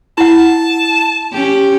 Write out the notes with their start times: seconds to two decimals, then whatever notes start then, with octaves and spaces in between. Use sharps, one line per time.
0.18 E4 F#5 A5
1.32 C#4 G4